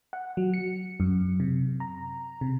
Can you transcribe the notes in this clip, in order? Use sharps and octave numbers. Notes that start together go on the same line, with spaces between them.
F#5
F#3
C#7
F#2
C3
A#5
C3